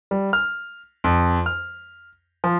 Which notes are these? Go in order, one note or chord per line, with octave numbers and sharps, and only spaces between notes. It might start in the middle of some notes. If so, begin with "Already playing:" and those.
G3
F6
F2
F6
F3